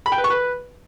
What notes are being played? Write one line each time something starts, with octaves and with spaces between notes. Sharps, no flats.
B5
G5
B4
C#6
B4